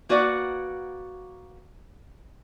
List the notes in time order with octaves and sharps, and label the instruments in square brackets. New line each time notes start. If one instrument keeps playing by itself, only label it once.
[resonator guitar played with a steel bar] A#3 F#4 B4 D5 E5 F#5